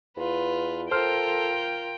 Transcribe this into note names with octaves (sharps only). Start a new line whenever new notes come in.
E2 F4 B4
F4 A4 A#4 C5 G5 F6